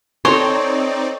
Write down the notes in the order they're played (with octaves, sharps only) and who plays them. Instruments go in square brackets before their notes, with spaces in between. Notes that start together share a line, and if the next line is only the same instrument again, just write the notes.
[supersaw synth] C4 D#4 D5 [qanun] A4 A#5 C6 [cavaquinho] C#5